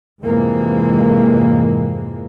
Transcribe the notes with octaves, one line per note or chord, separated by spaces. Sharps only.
F2 G#2 C3 E3 G#3 A#3